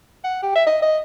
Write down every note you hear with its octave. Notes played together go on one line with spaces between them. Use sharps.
F#5
G4
E5
D#5
D#5